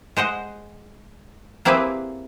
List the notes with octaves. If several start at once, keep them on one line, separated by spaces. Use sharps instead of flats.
G#3 C5 D#5 F#5
A#3 C4 E4 G4 G#4 B4